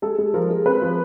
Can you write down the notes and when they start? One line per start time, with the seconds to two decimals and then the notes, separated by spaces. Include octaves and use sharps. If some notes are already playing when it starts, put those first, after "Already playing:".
0.02 G#3 A4
0.18 G#3
0.34 F3 A#4
0.50 G#3
0.66 C4 B4
0.82 F3